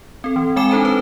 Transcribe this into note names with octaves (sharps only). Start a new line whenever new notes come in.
C4 A4
E3
G#3 C4 G5 G#5 D6 E7
C4 D4 D#4 A4 C5 A5
B4